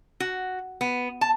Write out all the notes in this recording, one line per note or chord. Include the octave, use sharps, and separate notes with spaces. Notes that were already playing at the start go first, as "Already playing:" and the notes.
F#4
B3
A5